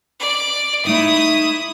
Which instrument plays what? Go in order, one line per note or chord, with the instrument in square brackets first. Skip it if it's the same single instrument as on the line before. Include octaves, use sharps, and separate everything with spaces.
[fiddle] D5
[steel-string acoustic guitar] A3 D#4 E5 [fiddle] E4 D#6